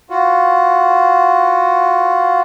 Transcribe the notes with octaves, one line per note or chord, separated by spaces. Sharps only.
F4 F#4